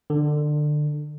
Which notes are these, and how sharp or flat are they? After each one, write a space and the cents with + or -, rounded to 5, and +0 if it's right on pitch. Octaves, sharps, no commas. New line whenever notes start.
D3 +25